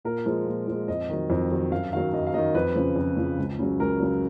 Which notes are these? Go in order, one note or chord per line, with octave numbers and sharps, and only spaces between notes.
A#2 A#4
F3 G#3
A#2
F3 G#3
F2 D#5
D#3 F#3
F2
D#3 F#3
F#2 F5
D#3 F#3 F5
F#2 D#5
F5
D#3 F#3 D#5
F2 B4
C#3 F3
F2
C#3 F3
C#2
C#3 F#3
C#2 A#4
C#3 F#3